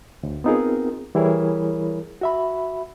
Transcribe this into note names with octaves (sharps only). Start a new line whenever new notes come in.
D2
B3 C4 D#4 F4 G#4 A#4
E3 G3 E4 G#4 A#4 C#5
F#4 E5 B5